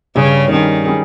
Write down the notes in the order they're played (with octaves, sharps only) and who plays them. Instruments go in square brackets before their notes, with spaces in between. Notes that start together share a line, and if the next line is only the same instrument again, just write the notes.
[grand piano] G2 G3 C#4 G#4 [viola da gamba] C#3
[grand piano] G2 G3 C#4 G#4 [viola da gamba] D#3
[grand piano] G3 C#4 G#4